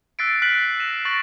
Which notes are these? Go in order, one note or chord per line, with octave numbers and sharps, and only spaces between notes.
E6 F#6 A6 B6 C7 D7
F6 F#6 B6 C7 D7 F#7
F#6 A#6 D#7 E7
C#6 F#6 A6 A#6 D7 F#7